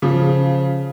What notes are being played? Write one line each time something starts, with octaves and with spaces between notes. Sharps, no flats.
C#3 F3